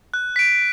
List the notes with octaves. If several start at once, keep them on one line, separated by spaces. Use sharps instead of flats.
F#6
B6 D7